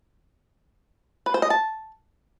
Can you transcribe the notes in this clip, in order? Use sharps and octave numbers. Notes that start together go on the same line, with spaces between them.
B4
C5
D#5
A5